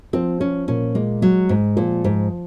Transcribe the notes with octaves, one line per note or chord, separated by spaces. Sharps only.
F3 C4
F3 C#4
A#2 C#4
G#3 A#3
F#3 G#3
G#2 G#3
A#2 F3
G#2 F3